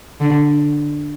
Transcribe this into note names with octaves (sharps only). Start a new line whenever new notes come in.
D3